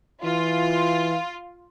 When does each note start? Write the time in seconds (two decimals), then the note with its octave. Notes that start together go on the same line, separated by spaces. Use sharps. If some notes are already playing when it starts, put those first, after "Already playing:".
0.24 E3 F4